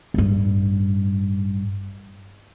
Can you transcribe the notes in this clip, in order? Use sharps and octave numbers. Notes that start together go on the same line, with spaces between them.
A1 G2